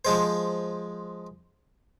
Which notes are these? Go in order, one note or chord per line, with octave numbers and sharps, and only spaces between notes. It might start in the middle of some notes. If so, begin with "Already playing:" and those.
F3 G#3 C5